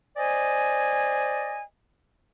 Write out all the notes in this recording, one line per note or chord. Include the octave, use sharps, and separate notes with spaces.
C5 D5 D#5 G#5